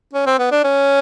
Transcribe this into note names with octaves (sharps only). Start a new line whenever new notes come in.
C#4
C4
B3
D4
C#4